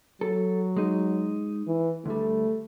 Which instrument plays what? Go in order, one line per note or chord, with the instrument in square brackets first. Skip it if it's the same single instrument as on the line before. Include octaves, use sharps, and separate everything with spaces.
[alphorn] F#3 [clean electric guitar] A4
[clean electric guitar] G#3 D#4
[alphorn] E3
[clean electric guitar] D2 G3 [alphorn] A3